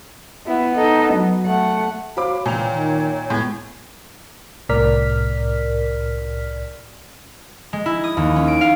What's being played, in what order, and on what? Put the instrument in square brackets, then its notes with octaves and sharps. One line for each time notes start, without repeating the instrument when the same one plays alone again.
[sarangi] B3 [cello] E4
[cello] D#4 A4
F#3
[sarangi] A3 [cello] F#5
[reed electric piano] F#4 C5 C#5 [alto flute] F5 [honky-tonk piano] B5 D6
[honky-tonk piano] A#2 F7 [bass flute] E3 [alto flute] C#5 [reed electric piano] G5 A#5
[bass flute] D#3
[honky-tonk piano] A2 G#6 [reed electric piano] G#3 [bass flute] B3 [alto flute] G#5
[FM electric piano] C2 A2 A#4 D5 F6 B6
[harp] G#3
E4
D#6
D#2
C#4
D7
F5